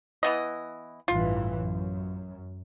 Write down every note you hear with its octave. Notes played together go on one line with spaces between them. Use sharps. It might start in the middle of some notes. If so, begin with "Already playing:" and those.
E3 B3 D#5
A1 G2 E3 F4
F#2